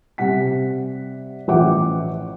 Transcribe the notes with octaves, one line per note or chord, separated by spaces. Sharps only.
C3 G3 F#5 B6
A1 F3 E5 F#5 G5 D6